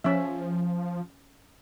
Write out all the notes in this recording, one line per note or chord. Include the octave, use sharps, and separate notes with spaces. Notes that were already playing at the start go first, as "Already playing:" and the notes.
F3 C#4 E5